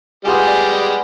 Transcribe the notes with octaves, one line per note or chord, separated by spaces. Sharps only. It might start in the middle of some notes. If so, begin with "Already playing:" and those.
G3 G#3 B3 F4 G4 G#4
D5